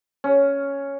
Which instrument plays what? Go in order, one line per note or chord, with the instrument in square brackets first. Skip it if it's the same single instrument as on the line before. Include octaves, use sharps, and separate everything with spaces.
[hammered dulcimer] C#4